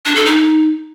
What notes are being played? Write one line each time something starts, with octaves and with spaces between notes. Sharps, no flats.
D4
A4
D#4